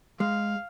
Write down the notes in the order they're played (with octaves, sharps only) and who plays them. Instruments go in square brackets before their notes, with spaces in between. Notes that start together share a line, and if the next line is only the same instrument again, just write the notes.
[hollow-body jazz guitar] G#3 [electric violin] F5